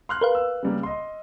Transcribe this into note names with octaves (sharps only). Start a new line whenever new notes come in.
C6 F6 F#6
A#4 B4 F5
E6
C#3 G3 A#3
D#5 C6